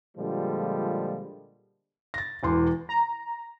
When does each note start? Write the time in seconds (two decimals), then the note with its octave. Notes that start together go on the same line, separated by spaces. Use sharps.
0.17 A#2 D3 F3 G3 G#3
2.14 A6 A#6
2.43 E1 E2 C6
2.89 A#5